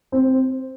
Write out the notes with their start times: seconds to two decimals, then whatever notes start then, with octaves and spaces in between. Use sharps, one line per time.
0.12 C4